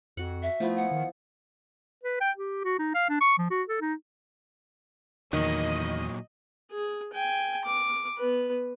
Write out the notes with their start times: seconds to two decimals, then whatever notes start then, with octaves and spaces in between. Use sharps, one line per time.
0.17 F2 F#4 F#5
0.43 E5
0.60 F3 A3 B3 E4
0.77 F#5
0.92 D#3
2.03 B4
2.20 G5
2.37 G4
2.64 F#4
2.79 D#4
2.94 F5
3.09 D4
3.21 C#6
3.38 F3
3.51 F#4
3.69 A4
3.81 D#4
5.33 E2 A#2 D#3 F#3 D#5
6.72 G#4
7.13 G5 G#5
7.65 D6
8.17 B3 B4